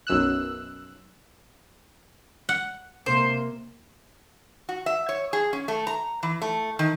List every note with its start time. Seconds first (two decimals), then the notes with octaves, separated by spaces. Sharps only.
0.07 B1 F#2 E6 F#6
2.49 F#5
3.06 C3 A#3 C5
4.69 F#4
4.86 E5
5.09 C#5
5.33 G#4
5.53 C#4
5.68 A3
5.87 A#5
6.23 E3
6.42 A3
6.79 D#3